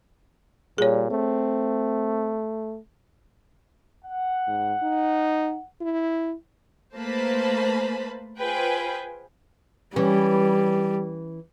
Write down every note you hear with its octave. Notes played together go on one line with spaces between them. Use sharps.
A#2 G3 G#4 C#5
A3 C4
F#5
G#2
D#4
E4
A3 A#3 B4 C5 A5 B5
F4 G#4 B4 C5 G5 G#5
E3 G3 C#4